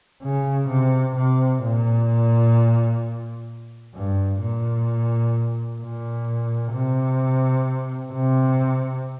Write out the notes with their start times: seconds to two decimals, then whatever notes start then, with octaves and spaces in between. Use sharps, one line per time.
0.23 C#3
0.69 C3
1.16 C3
1.62 A#2
3.94 G2
4.41 A#2
5.80 A#2
6.73 C3
8.13 C3